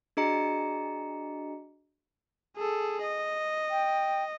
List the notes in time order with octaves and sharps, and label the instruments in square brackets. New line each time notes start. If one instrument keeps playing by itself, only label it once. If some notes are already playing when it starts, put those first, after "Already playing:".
[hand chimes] D4 F#4 G#4 D#5 A#5 C#7
[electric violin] G#4 A4
D#5
[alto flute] G5